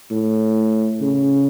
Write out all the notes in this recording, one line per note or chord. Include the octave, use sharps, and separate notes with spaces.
A2
C#3